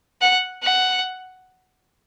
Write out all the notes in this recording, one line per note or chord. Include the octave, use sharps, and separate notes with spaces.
F#5
F#5